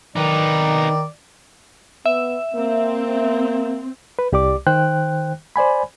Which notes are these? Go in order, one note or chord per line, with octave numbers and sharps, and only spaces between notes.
D#3 D#4 B4 D5
B3 E5
A#3 C4
B4
C2 G4 D5 D6
D#3 C5 G5 F#6
C5 D5 G#5 B5